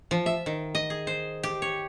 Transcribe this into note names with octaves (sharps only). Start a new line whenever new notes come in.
F3
E5
D#3
D#5
G#4
C5
G4
C#5